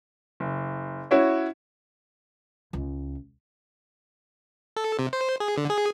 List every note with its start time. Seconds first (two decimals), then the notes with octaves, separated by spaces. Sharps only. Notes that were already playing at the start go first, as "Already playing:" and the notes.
0.40 F#1
1.11 C#4 E4 F#4 C#5
2.73 C#2
4.76 A4
4.99 C3
5.13 C5
5.40 G#4
5.57 D3
5.70 G#4